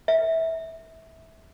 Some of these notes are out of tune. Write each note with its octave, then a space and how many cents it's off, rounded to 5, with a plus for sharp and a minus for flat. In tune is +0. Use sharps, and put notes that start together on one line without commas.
E5 -20